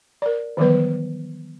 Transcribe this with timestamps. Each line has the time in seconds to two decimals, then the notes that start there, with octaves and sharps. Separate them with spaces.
0.22 A#4 D5
0.57 D#3 E3 F#3 G3 B3 B4